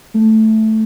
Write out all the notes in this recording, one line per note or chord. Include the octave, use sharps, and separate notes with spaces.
A3